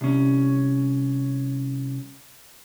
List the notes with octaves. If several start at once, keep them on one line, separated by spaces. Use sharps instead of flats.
C2 C#4